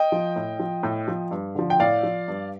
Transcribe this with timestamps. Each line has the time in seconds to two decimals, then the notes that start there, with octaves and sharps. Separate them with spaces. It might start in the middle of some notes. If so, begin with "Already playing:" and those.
Already playing: D#5 G5
0.12 F3
0.36 A2
0.60 F3
0.83 A2
1.08 F3
1.31 G2
1.55 D3 F3
1.70 G5
1.80 A2 D5 F5
2.03 F3
2.28 G2